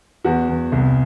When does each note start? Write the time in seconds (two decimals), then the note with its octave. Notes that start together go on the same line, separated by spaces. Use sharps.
0.25 E2 F#4
0.49 E2
0.72 C2